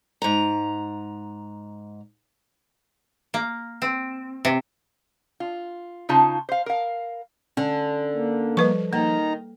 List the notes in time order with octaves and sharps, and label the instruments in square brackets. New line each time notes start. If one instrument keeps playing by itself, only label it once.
[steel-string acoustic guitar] G#2 A#5
[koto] A#3
C4
C3
[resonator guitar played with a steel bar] F4
C#3 D#4 F4 A5
C5 F5
A#4 F5
[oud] D3 [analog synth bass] C#4
[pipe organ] A#3
[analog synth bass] F3 [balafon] G3 B4 C#6
[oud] D#3 [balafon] A#3 [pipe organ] D#4 A#5